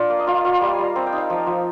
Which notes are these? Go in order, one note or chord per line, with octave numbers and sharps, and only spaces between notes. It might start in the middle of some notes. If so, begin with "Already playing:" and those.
Already playing: D4 F4 A#4
A#3 F5
D#5
F4 F5
F4 F5
G3 F5
G#5
G3
A#5
C4 A#5
G5
D#4
F5
F3
F3